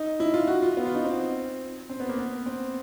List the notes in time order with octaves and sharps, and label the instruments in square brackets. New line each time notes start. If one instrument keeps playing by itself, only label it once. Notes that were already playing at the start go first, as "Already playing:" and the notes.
Already playing: [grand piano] D#4
E4
F4
F#4
F4
B3
F4
D#4
C4
C4
B3
A#3
B3
C4